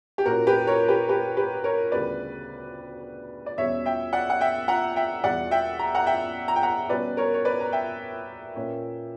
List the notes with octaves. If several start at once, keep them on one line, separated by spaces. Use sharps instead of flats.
G4
A#2 A#3 C#4 F#4 A#4
G4 B4
A#4 C#5
G4 B4
G4 B4
G4 B4
A#4 C#5
D2 C#3 G3 B3 B4 D5
D5
E2 B2 G3 C#4 C#5 E5
E5 G5
D5 F#5
F#5
E5 G5
F#5 A#5
E5 G5
E2 B2 G3 D5 F#5
E5 G5
A#5
F#5 A#5
E5 G5
A#5
G5
F#5 A#5
B2 G3 C#4 B4 D5
A#4 C#5
C#5
B4 D5
A#5
E5 G5
A#2 A#3 C#4